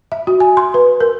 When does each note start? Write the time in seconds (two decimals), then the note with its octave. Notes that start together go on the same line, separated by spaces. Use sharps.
0.12 E5
0.27 F#4
0.40 G#5
0.57 C6
0.74 B4
1.00 A#4